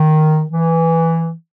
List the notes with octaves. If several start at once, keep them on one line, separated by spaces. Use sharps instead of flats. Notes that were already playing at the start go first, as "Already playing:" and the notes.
Already playing: D#3
E3